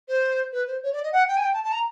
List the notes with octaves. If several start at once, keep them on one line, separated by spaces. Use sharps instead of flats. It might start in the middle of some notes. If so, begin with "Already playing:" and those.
C5
B4
C5
C#5
D5
D#5
F#5
G5
G#5
G5
A5
A5
A#5